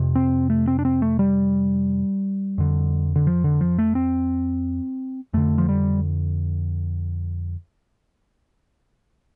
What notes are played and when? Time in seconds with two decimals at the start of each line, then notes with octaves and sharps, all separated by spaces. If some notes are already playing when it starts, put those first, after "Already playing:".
Already playing: F2 C3
0.15 C4
0.50 A3
0.68 C4
0.79 D4
0.85 C4
1.02 A3
1.19 G3
2.58 F2 D3
3.16 D3
3.27 F3
3.44 D3
3.61 F3
3.78 A3
3.95 C4
5.34 F2 D3 A3
5.58 F3
5.69 G3